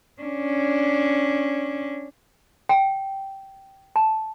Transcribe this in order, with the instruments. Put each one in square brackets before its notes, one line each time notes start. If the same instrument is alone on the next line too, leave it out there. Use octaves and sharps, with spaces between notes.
[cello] C#4 D4
[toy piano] G5
A5